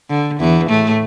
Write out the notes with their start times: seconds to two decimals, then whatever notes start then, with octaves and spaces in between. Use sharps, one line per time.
0.10 D3
0.40 E2 E3
0.70 A2 A3